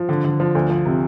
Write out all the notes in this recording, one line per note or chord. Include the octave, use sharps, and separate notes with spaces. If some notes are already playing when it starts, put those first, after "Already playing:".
Already playing: F3
D3
D3
F3
D2
F3
C3